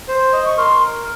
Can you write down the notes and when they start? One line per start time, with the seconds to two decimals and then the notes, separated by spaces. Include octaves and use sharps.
0.08 C5
0.33 D#5
0.45 C#6
0.58 A#4 C6